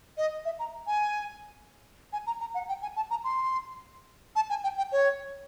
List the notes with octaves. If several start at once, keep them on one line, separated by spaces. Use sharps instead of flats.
D#5
E5
A#5
G#5
G#5
A#5
A#5
F#5
G5
G#5
A5
A#5
C6
A5
G#5
G5
G5
C#5